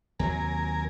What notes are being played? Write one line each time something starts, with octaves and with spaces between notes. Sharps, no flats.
D#2 C3 F#3 A#4 G#5